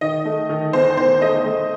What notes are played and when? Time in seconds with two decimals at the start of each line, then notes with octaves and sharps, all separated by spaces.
0.01 D#3 D#5
0.25 A3
0.49 D#3
0.73 E2 C5
0.97 D#3 C5
1.22 A3 D#5
1.45 A3